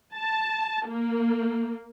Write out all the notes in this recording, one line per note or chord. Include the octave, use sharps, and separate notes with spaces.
A5
A#3